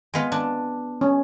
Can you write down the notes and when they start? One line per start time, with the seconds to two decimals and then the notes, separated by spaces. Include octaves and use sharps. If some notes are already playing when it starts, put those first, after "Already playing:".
0.14 G#3 B3 F4
0.32 D4
1.01 C#4